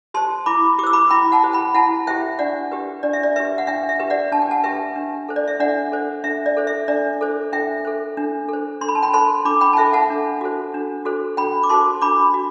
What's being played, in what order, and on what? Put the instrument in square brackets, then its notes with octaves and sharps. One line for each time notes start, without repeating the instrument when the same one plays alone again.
[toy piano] G4 C5 A5 C6
E4 B5 D6
G4 D6
C5 E6
B5 D6
E4 G5 B5
F#5 A5
G4 C5
G5 B5
E4 F#5 A5
G4 C5 E5 G5
D4 D5 F#5
G4 B4
D4 D5
E5
D5
G4 B4 E5
F#5
D4 E5 G5
E5
G4 B4
D5 F#5
D4 A5
G5
F#5 A5
G4 B4 E5 G5
D4
A4 C5
D5
E5
D4 D5 F#5
A4 C5
D4 E5
D5
A4 C5
E5
D4 D5
A4 C5
D4 E5 G5
A4 C5
D4
A4 C5
D4 C6
B5
A5
G5 B5
A4 C5 A5 C6
D4 B5 D6
G5 B5
A5
A4 C5 E5 G5
F#5 A5
D4
F#4 A4 C5
D4
F#4 A4 C5
D4 G5 B5
D6
F#4 A4 C5 A5 C6
D4 B5 D6
F#4